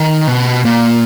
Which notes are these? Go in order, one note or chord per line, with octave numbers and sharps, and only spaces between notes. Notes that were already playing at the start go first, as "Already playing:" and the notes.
Already playing: D#3
B2
A#2